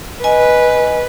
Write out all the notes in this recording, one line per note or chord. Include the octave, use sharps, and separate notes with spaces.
B4 D#5 G#5